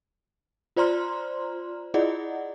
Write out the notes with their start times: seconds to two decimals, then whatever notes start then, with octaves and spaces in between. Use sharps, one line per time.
0.76 F4 C5 D5 A#5 C6 F6
1.94 E4 F4 G#4 D5 D#5 F#5